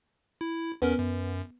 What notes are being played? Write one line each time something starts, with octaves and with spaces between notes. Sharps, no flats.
E4
E2 B3 C#4 A#4
F#2